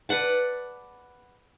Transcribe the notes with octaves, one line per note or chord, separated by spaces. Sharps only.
B4 D5 F#5 A5